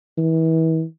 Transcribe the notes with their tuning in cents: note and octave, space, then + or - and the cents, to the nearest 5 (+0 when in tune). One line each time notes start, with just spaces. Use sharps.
E3 -35